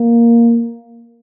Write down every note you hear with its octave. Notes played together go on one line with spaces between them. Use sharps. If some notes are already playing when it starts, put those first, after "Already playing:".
Already playing: A#3